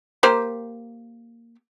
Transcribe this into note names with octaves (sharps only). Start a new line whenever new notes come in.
A#3 G4 C5